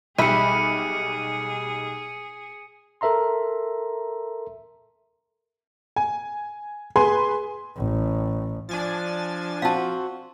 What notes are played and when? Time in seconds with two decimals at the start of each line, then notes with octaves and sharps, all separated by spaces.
0.19 B1 G3 G#4 E5 B5 C#7 D#7
3.01 A4 A#4 E5 A#5 C6
5.96 G#5
6.96 G#4 B4 G#5 C6
7.77 A1
8.69 F3 D4 G#5 A6
9.62 C4 F#4 F5 A5